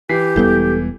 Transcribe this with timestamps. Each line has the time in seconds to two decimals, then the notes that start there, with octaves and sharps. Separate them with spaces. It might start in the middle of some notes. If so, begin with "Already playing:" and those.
0.09 E3 G4 B6 C7
0.36 E1 G3 B3 E4 A4 G6